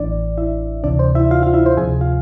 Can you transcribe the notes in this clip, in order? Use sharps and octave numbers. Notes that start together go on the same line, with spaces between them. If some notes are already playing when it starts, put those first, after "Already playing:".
Already playing: A1 A2 E3 D4 D5
E4 E5
D2 C3 E3 D4 D5
C5
E4 E5
F4 F5
F4 F5
E4 E5
C5
D2 C3 F3 G#4 G#5
F4 F5